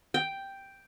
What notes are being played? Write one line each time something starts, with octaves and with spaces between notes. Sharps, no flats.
G5